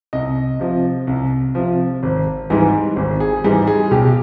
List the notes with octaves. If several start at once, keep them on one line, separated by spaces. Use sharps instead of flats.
C2 D#5
C3 F3
C2
C3 F3
G#1
G#2 E3 G3
G#1
G#4
G#2 E3 G3
G#4
B1 G4